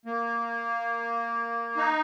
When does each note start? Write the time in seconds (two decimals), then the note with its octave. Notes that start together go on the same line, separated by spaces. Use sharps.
0.06 A#3
1.77 D#4